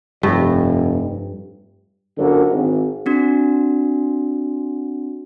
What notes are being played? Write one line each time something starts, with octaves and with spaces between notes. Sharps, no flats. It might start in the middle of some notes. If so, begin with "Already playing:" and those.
F1 G2
G1 F#2 D3 F#4 A#4
G#1
C4 D4 F#4